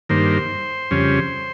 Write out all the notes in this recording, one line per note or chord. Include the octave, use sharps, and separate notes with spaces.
G2 D#3 A#3 C5
F2 C#3 G3 C#4